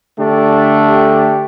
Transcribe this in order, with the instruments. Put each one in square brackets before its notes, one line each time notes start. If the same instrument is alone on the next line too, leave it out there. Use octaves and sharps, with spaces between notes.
[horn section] D3 A3 D4 [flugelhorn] G4
[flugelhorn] G4